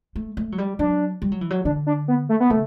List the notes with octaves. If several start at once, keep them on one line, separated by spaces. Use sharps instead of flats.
A3
A3
F#3
G3
F#3 D4
G3
F#3
E3
F#3
D3 D4
D4
B3
A3
B3
C#3 A3